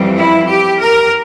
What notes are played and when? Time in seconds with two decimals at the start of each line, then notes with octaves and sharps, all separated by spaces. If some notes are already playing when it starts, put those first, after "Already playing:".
Already playing: F2 E3 G3 C4
0.17 E4
0.48 G4
0.80 A#4